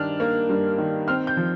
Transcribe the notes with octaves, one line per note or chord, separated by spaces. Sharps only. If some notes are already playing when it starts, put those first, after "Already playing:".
Already playing: G2 D#3 D4 F6
A#3
G2
D#3
C4 F6
G6
F3